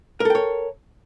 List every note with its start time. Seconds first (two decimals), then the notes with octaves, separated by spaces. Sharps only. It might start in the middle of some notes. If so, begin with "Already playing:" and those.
0.20 A#4
0.25 A4
0.30 G5
0.35 C#5